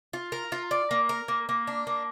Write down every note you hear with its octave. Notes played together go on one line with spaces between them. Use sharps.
F4
A#4
F4
D5
A#3
A#4
A#3
A#3
D4
A#3